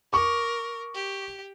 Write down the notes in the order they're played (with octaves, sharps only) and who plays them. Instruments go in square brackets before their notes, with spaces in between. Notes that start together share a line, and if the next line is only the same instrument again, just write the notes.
[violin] A#4 [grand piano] C#6 D6
[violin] G4